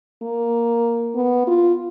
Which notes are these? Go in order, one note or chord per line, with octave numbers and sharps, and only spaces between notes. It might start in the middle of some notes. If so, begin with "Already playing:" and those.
A#3
B3
F4